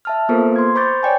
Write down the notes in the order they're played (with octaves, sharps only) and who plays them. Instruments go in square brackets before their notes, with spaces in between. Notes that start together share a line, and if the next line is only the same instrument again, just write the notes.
[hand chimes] E5 A5 F6
A#3 B3 F4 A4 A#4 C5
C6 G#6
C5 B5 C#6 D6 G6 A6
C#5 D5 G5 G#5